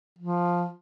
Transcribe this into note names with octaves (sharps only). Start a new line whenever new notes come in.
F3